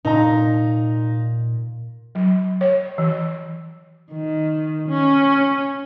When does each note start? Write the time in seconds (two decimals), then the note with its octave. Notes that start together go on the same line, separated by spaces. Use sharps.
0.05 A#2 D#4 A#5
2.15 F#3
2.61 C#5
2.98 E3
4.12 D#3
4.89 C#4